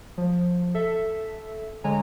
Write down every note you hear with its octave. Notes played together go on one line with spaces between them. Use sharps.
F3
A4 E5
D3 G#3 C#5 G#5 A#5